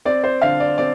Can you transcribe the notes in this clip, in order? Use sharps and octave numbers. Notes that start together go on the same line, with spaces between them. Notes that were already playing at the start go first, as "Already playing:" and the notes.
C4 D5
C5
D3 F5
D5
C4 D5